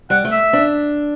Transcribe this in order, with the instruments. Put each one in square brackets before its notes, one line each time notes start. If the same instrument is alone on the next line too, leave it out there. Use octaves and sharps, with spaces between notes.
[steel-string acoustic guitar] G3 [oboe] F#5
[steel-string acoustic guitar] A3
[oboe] E5
[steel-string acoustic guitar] D4